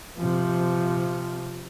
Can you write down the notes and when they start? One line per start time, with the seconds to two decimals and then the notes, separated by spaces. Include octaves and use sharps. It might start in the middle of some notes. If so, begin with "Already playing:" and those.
0.18 C3 F3